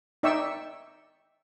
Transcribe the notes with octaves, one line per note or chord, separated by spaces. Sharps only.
D#4 D5 E5 G5 C#6 E6